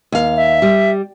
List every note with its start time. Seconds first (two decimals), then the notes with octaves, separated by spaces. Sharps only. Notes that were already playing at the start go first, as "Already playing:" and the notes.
0.12 D#2 F5
0.36 E5
0.62 G3